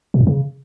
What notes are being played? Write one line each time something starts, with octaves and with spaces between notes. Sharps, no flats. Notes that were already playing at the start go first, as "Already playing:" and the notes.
B2
G2
C#3